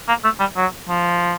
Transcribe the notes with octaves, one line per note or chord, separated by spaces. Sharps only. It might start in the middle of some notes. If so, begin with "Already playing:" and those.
A#3
A3
G3
F#3
F3